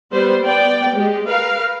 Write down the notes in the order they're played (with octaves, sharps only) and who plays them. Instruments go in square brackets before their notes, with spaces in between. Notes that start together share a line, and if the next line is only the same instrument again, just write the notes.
[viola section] G3 B3 B4 C5
B3 D5 G5
G#3 G4
A#4 B4 F5